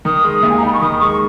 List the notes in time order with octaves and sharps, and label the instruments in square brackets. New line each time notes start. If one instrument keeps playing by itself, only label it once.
[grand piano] D#3 [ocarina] D#6
[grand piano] G#3
D#2
[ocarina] G#5
A#5
[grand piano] D#4 [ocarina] B5
[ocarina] C#6
[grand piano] D#3 [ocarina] D#6
[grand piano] G#3 [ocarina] C#6